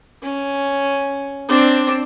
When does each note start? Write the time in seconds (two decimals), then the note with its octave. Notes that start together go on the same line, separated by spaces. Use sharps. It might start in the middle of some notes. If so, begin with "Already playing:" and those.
0.22 C#4
1.48 C4 D4